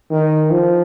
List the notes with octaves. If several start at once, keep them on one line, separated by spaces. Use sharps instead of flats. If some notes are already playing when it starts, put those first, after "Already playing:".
D#3
F3